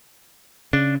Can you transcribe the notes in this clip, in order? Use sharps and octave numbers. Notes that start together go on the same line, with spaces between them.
C#3 D4